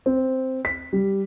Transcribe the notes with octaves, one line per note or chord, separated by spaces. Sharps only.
C4
B6
G3